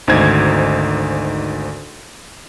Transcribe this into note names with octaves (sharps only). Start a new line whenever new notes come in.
G#1 D2 D#4 C5 G#6